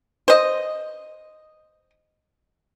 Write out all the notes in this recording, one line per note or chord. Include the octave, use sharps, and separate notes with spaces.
C5 D#5